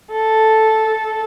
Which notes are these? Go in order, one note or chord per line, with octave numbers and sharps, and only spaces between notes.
A4